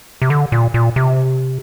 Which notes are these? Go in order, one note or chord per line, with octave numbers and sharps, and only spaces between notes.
C3
D3
A#2
A#2
C3